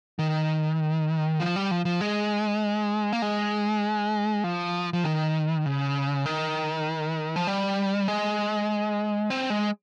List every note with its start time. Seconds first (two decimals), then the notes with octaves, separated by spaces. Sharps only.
0.19 D#3
1.40 F3
1.56 G3
1.71 F3
1.85 F3
2.01 G#3
3.13 A#3
3.22 G#3
4.44 F3
4.93 F3
5.04 D#3
5.66 C#3
6.26 D#3
7.36 F3
7.47 G3
8.08 G#3
9.30 C4
9.50 G#3